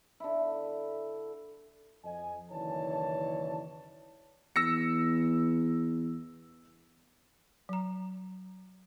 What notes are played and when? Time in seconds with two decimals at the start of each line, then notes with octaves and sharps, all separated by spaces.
0.20 D3 E4
2.04 F2 D#5 G#5
2.50 F#1 D#3 E3 C#5 D5 A5
4.56 E2 E6 A#6 C#7
7.69 F#3 A#5